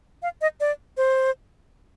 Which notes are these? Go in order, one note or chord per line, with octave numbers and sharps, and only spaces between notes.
F5
D#5
D5
C5